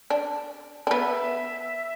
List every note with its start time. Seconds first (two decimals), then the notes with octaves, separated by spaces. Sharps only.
0.10 D4
0.87 D4
0.91 B3 E5